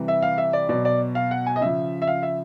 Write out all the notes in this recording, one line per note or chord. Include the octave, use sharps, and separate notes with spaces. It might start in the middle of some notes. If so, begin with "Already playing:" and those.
Already playing: C3 E3 G3
E5
F5
E5
D5
B2 F#3 D5
D5
F5
F#5
G#5
D#5
C#3 F3 E5
E5
F5
E5